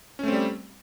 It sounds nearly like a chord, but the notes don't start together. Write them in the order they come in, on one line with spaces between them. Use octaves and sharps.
C#4 A3 C4 G3